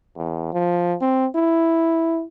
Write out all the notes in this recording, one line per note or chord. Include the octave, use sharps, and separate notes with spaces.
E2
F3
C4
E4